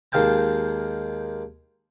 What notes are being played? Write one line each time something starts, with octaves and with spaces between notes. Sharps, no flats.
D#2 D#3 G#3 F5 G5 A5